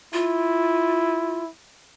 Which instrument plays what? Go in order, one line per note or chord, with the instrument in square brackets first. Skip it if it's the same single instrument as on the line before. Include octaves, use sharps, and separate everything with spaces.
[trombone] E4 [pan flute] F4